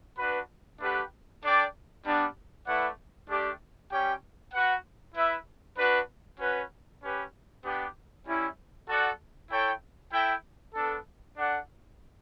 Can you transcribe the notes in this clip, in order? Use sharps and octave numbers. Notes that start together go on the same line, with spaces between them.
D4 F#4 B4
A3 D4 G4 B4 F#5
D4 A4 D5 G5
G3 B3 D4
A3 E4 B4 D5 F#5
A3 D4 G4 D5
G3 C#4 G4 C#5 G5
F#4 B4 F#5
E4 B4 E5
D4 F#4 B4
C#4 F#4 B4
C#4 G4 B4
B3 D4 G4
G3 C#4 E4
F#4 A4 D5 F#5
E4 A4 C#5 G5
E4 A4 E5 G5
B3 D4 A4
D4 A4 D5 F#5